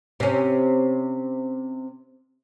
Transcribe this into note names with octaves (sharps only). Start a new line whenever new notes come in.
C3 C#4